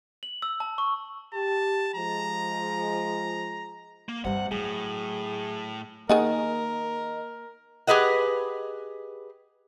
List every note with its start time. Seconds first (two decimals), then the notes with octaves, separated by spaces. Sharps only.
0.23 F#7
0.42 E6
0.60 A5
0.78 C#6
1.34 G4 A5
1.95 F3 G#3 A#5
4.09 A#3
4.25 G2 C3 G3 F#5
4.51 A2 F#3 G#4
6.09 D#3 A#3 G#4 A#4 D#5 F#5
7.87 G4 G#4 B4 D#5 F#5